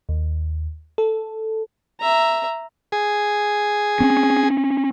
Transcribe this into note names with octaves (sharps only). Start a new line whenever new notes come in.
D#2
A4
E5 A#5
G#4
C4 C#4